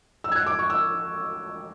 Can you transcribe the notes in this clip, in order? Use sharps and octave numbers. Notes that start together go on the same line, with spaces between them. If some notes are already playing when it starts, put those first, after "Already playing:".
E6
G#6
F#6
D6
C#6
E6